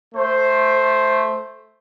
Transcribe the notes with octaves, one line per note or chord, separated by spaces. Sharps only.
A3 C5